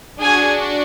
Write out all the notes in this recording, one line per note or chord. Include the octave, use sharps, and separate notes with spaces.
D4 F#4 G#4 G#5